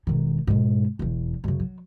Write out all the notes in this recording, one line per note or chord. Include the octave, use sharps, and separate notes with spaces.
E1 D#3
G#2 B2
E1 E2
F#2 C#3
F#3